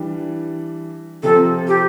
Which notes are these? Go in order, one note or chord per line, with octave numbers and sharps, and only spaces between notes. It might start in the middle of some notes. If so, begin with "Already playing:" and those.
Already playing: E3 G3 D4
C3 F3 C4 A4
G4